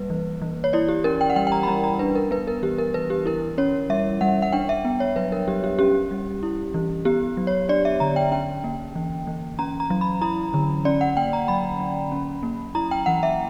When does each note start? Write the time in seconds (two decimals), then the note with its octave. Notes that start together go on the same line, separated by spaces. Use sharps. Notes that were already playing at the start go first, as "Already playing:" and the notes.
Already playing: G3 A#3 B4
0.10 E3
0.42 E3
0.64 C#5
0.73 E4 D5
0.88 G4
1.04 C#4 A#4
1.21 G5
1.30 F#5
1.36 G3 G5
1.47 G5
1.52 A#5
1.63 B5
1.68 G3 A#5
1.84 A#5
1.99 D4 B4
2.15 A#4
2.31 B3 B4
2.47 A#4
2.63 E3 G4
2.78 A#4
2.94 E3 B4
3.10 G4
3.26 E4 A#4
3.58 C#4 C#5
3.90 G3 E5
4.21 G3 F#5
4.42 F#5
4.52 D4 G5
4.69 E5
4.85 B3
5.00 C#5
5.16 F#3 B4
5.32 A#4
5.48 F#3 G4
5.64 G4
5.79 C#4 G4
6.11 G3
6.43 E4
6.74 E3
7.05 B3 G4
7.37 F#3
7.47 C#5
7.69 D4 D5
7.85 E5
8.00 D3 A#5
8.16 G5
8.32 C#4 G5
8.64 A#3
8.95 E3
9.27 E3
9.59 C#4 A#5
9.80 A#5
9.90 F#3
10.01 B5
10.21 E4 A#5
10.54 D3
10.85 C#4 D5
11.01 F#5
11.17 A#3 G5
11.33 A#5
11.48 F#3 B5
11.80 F#3
12.12 C#4
12.43 A#3
12.75 E4 A#5
12.91 G5
13.06 E3 F#5
13.23 E5